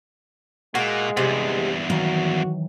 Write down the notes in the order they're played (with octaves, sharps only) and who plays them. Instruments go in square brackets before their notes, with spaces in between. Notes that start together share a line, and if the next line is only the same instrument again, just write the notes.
[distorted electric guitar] A#2 A#3 [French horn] G#3 [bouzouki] F#4
[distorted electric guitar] E2 G2 [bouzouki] C3
[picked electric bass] D#3 E3 F#3 [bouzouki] A#3 [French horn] F#4